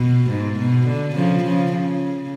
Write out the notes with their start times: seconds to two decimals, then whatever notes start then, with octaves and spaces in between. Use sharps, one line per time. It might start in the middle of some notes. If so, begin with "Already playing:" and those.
Already playing: B2
0.30 G#2
0.59 B2
0.87 D3
1.15 C#3 F3
1.44 C#3 F3
1.72 C#3